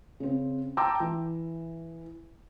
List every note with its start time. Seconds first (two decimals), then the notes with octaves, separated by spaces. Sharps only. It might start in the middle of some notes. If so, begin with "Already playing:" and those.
0.20 C#3 C4
0.77 G5 A5 A#5 C6 D6 E6
1.00 E3